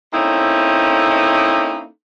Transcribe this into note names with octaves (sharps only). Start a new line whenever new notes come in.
A#3 C4 C#4 D#4 E4 A4